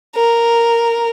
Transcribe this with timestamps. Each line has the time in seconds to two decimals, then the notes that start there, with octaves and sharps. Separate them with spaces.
0.15 A#4